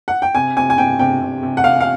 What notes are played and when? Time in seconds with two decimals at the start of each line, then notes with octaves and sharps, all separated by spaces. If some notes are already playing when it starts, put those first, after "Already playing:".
0.08 F#5
0.22 G5
0.35 C3 G#5
0.56 C3 G#5
0.70 G#5
0.78 C3 G5
0.99 C3 G5
1.21 C3
1.43 C3
1.57 F#5
1.64 C3 F5
1.80 F5